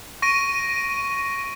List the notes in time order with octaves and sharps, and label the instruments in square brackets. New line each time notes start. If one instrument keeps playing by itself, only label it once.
[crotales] C#6 A#6 D7 D#7